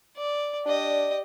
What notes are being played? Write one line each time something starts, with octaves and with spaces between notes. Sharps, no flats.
D5
D4 G4 D5 D#5